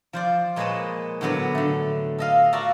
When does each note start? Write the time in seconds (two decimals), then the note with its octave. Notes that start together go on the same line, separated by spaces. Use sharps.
0.13 F3 C5 D5
0.56 A#2 G#3 B4 C#5 D#5 A5
1.21 A2 D3 F#3 B3 D5
1.55 D3 A3
2.18 A4 D#5 F5
2.52 F4 F#4 A4 A#4 D5 E5